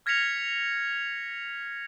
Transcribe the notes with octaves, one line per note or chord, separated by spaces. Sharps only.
F6 G#6 A#6 B6 C#7 F7